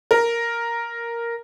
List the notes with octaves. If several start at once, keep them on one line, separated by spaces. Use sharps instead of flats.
A#4